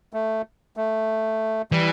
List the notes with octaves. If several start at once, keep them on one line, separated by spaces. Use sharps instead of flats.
A3
A3
E3 G3